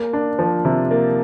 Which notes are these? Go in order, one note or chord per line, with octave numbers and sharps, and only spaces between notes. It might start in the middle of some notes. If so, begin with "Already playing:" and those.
Already playing: A#3
D4
F3
C3
A#3